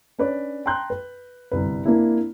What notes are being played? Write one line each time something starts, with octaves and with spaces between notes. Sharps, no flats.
C#4 D4 B4 C#5 D5
G5 A5 A#5 C6 F#6 G6
B4
G1 C2 B4
A#3 C4 D4 E4